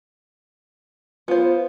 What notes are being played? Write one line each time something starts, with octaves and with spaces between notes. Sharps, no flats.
B3 F4 C5